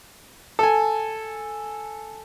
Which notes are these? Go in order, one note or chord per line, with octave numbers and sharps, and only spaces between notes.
A4 G#5